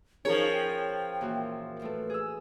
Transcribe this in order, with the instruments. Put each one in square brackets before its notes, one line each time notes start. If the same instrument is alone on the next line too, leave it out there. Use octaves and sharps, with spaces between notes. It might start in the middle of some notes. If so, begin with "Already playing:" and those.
[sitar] F3 C#5 [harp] C#4 [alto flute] D#4 [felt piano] G#4 A#4
[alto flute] G5
[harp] A#2 E3 F#4
[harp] A2 A3 A4 [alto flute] B4
[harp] G#4 E6